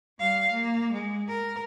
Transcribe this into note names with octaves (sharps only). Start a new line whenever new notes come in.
G3 F5
A#3
G#3
A#4